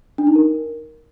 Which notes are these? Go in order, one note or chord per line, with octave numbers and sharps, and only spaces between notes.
D4
D#4
A#4